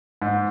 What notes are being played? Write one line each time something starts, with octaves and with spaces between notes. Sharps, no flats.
G#2